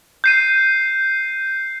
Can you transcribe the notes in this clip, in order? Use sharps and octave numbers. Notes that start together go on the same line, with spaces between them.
G6 C7 D#7